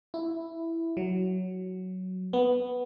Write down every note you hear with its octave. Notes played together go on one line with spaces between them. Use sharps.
E4
F#3
B3